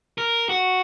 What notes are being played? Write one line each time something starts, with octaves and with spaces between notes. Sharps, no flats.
A#4
F#4